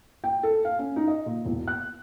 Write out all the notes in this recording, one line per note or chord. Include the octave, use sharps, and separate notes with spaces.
G5
A4
F5
C#4
D#4
D#5
A#2
E1
F#6